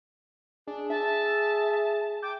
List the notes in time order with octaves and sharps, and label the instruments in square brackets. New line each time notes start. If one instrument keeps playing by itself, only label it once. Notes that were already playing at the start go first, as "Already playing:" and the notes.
[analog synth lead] D4 [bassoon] G#4
[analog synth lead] E5 [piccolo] A5
[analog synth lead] G5 [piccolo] D6